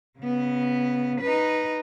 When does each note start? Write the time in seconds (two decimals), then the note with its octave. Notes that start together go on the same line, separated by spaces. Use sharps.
0.19 C#3 B3
1.21 D#4 B4